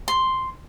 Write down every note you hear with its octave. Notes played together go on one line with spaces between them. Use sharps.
C6